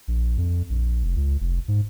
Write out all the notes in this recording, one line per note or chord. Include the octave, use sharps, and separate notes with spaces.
A#1
F2
A#1
F1
C#2
F1
G#2